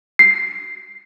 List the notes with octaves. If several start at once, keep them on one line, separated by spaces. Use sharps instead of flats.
C7